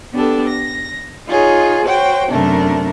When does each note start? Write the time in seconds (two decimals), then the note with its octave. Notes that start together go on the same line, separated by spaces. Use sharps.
0.13 B3 D4 G4 A4
0.48 A#6
1.27 D#4 F4 G#4 C#5
1.86 F#4 C5 C#5 G5
2.31 F#2 C3 A3 D4 A#4